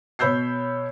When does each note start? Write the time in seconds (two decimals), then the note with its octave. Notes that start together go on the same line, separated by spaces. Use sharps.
0.19 B2 C#5 B5 E6 G6 C7